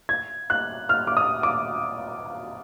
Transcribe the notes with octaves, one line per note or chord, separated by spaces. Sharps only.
G#6
F#6
F6
D6
D#6
D6